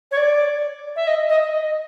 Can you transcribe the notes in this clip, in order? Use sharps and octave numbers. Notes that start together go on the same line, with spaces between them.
C#5
D5
E5
D#5
D#5
D#5